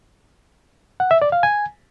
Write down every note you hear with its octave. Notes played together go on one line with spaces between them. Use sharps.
F#5
E5
D5
F5
G#5